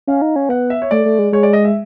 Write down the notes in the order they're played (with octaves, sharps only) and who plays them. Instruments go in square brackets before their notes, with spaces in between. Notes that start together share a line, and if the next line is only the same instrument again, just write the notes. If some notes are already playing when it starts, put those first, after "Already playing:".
[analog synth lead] C#4 [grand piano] F5
[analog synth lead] D#4
C#4
[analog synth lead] B3 [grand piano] F#5
[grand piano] E5
C#5
[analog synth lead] A3 [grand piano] D5
[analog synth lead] A3
G#3
[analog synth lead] G#3 [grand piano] C#5
[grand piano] D5
D#5
E5